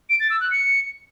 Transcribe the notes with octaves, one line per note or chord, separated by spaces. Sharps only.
D7
A6
E6
F#6
C#7